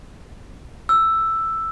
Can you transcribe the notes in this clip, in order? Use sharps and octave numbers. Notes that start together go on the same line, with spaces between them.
E6